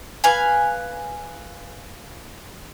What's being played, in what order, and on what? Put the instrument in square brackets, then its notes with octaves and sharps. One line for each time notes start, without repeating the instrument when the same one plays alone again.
[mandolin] B4 F5 G#5